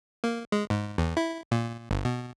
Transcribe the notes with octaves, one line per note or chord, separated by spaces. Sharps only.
A#3
G#3
G#2
E2
E4
A#2
G1
B2